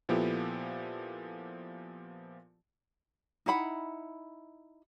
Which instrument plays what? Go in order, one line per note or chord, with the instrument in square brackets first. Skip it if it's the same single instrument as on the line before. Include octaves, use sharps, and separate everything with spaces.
[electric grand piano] A#2 F3 B3 E4 G4 A4
[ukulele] D#4 E4 F#5 B5